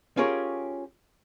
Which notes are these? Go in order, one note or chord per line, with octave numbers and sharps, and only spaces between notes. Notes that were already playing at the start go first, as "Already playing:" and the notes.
C#4 F4 G4 G#4 A#4 C#5